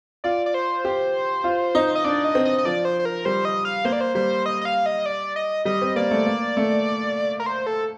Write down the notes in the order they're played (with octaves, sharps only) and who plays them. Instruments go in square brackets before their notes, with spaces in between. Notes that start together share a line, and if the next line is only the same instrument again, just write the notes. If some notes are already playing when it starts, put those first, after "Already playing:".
[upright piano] F4 [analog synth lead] D5
[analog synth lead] D5
C5
[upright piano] G4
F4
D#4
[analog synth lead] D#5
[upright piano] D4 [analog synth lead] D5
[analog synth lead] D#5
[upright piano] C4
[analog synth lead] D#5
D#5
[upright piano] F3 [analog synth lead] D5
[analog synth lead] C5
C5
A#4
[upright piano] G3 [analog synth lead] C5
[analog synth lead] D#5
F5
[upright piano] A#3 [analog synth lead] C5
[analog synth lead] D5
C5
[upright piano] G3 [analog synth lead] C5
[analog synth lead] D#5
D#5
F5
D#5
D5
D#5
[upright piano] G3 [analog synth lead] D#5
[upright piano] C4
[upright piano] A#3 [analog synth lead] D5
[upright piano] A3
A#3
A3
[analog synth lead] A#4
C5
A4